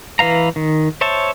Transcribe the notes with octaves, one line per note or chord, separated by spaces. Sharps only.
E3 B4 F5 A#5
D#3
C5 C#5 E5 A5